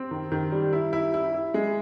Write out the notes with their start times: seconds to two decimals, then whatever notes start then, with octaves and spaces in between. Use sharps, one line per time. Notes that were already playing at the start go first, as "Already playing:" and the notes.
Already playing: C4
0.11 D#3
0.32 D#3
0.52 G3
0.73 E4
0.93 E4
1.14 E4
1.34 E4
1.54 G#3